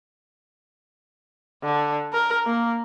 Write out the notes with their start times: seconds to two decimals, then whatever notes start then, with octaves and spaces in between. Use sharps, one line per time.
1.63 D3
2.13 A#4
2.46 A#3